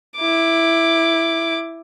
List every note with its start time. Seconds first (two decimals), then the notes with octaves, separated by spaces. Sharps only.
0.17 E4 D6